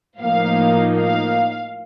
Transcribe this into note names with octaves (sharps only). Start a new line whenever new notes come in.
A2 F3 A#3 D#4 F5
F5